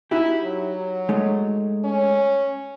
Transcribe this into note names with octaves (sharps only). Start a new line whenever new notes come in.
D#4 E4 F#4 G4
F#3
G#3 A3 D#4
C#4